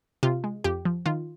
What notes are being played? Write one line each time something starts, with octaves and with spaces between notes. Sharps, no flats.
C3 F4
G#3
F2 G4
F3
D#3 F4